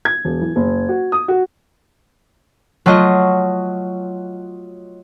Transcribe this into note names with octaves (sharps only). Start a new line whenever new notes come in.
G#6
E1
E3
F#1
F#4
D#6
F#4
F#3 A3 F4 F#4 D#5